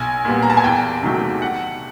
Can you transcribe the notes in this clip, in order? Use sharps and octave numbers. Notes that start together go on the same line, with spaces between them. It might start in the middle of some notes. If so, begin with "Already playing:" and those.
Already playing: B1 G#5
A#2 G3 B3
A#5
A5
G#5
E2 G5
C3 D#3 F#3 A3
F#5